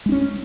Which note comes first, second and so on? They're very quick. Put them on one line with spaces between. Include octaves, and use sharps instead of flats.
G#3 D4 C#4